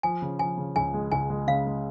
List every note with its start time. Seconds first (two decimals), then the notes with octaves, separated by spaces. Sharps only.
0.03 F3 G#5
0.22 C#3
0.39 F3 G#5
0.58 C#3
0.76 C#2 G#5
0.94 G#3
1.12 C#2 G#5
1.30 G#3
1.47 C#3 F5
1.67 G#3